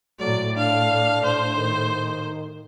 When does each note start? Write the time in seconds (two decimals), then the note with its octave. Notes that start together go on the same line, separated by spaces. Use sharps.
0.19 A2 F#3 D5
0.57 D4 F5
1.25 A2 C5
1.56 D#3